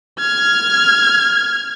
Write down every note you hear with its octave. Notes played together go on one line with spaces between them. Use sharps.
F6 G#6